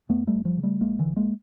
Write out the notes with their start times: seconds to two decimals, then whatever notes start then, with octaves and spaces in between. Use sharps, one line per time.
0.09 F2 A3 B3
0.27 G3 A3
0.34 F#1
0.45 F3 G3
0.58 C#3
0.63 G3 A3
0.81 A#1 G#3 A#3
0.99 D3 E3
1.05 A#1
1.16 G#3 A#3